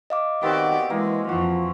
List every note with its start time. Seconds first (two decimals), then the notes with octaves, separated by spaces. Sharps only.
0.10 D#5 F5 D6
0.43 D#3 B3 C4 F#4 G4 D5
0.90 E3 G#3 A#3
1.29 F2 E3 F3 F#4